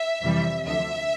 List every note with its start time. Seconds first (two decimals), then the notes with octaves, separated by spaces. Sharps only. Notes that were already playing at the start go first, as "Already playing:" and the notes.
Already playing: E5
0.21 F2 C3 E3 G3
0.65 D2 D3 F3 E5